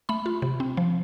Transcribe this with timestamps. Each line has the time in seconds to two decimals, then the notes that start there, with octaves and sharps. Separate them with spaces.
0.09 A3 B5
0.26 F4
0.42 C3
0.60 C4
0.77 F3